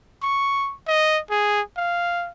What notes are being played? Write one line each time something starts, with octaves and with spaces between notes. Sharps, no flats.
C#6
D#5
G#4
F5